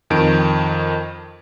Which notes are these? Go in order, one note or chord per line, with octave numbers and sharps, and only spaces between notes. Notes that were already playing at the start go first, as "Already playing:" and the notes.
F2 D#3 D7